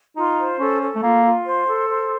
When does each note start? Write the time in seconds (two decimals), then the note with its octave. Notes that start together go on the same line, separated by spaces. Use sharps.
0.16 D#4 F4
0.39 C5
0.59 C#4 A4
0.82 A4
0.95 A3
1.03 A#3 F4
1.25 F4
1.45 C5
1.68 A4
1.89 C5